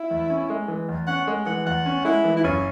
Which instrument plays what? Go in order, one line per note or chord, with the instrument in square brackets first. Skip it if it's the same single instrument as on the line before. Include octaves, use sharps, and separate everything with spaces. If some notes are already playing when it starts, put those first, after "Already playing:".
Already playing: [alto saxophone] E4
[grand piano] E2
C#4
G#3
E3
E2
[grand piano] C#4 [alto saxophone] F#5
[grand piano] G#3
[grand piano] E3 [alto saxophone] F#5
[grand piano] E2 [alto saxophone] F#5
[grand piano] C#4
[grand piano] G#3 [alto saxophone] E4
[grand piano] E3
[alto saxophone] E4
[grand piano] F#1 [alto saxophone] C#4